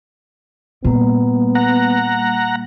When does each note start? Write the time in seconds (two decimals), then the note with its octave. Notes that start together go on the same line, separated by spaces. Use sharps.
0.85 A#2 G3 A#3 B3
1.55 F#5 A#5